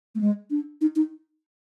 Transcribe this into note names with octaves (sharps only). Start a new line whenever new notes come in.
A3
G#3
D4
D#4
D#4